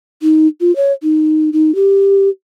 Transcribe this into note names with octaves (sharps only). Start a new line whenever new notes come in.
D#4
F4
C#5
D#4
D#4
G4